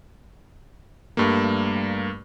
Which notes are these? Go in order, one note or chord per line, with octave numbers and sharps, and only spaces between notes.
G2 G3 A3 A#3